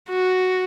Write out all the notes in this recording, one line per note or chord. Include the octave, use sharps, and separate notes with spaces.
F#4